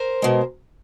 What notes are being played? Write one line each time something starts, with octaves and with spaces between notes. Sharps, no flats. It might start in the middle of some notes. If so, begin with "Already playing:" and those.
Already playing: A#4 C5
B2 G#3